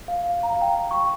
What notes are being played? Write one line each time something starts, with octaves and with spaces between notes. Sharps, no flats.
F5
F5
A#5
F5
G5
C#6